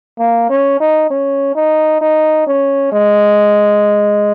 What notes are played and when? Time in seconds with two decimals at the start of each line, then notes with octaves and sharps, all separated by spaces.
0.19 A#3
0.50 C#4
0.80 D#4
1.10 C#4
1.55 D#4
2.01 D#4
2.47 C#4
2.92 G#3